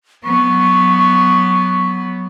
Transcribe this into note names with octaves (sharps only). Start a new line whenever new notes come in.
F#3 B3 C#6